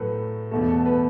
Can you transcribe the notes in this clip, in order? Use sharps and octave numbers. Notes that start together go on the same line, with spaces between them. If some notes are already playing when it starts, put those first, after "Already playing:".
Already playing: A2 F#3 A3 A4 B4
E2 B2 A3 A4
A4
B4